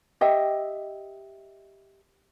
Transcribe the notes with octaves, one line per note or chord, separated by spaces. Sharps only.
G4 D#5 E5 G5